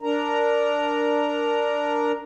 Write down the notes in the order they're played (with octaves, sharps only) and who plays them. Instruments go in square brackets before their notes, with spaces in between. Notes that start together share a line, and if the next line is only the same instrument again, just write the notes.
[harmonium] D4 A#4 A#5